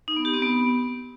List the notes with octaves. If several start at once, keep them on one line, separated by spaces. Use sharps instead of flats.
D#4
B3
G4
C4
B3